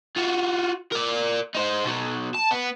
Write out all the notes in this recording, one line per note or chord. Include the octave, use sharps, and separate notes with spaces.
F4 F#4
A#4 D5
D#4 C5
B2 F#3
A5
B3